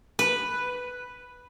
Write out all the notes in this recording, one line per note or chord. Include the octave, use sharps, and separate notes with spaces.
B4